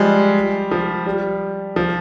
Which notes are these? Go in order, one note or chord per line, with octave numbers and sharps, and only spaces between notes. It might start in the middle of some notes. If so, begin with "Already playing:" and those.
Already playing: F3 G3 G#3
F3
G3
F3